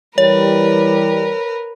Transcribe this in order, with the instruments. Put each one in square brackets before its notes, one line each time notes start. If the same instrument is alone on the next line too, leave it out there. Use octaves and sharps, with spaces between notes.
[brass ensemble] E3 G3 [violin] A#4 B4 [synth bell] C#5